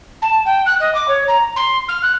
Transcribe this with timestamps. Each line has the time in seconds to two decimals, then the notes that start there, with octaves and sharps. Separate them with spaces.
0.22 A5
0.45 G5
0.66 F#6
0.80 D#5
0.95 D6
1.08 C#5
1.28 A#5
1.56 C6
1.88 F6
2.02 F#6